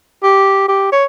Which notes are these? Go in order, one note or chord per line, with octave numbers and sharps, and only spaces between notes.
G4
G4
C#5